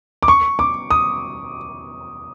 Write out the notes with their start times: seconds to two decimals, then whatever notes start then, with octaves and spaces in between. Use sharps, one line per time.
0.23 D6
0.28 C#6
0.59 D6
0.90 D#6